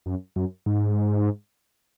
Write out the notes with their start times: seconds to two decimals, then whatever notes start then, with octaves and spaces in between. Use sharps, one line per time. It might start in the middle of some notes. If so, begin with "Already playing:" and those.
0.06 F#2
0.36 F#2
0.66 G#2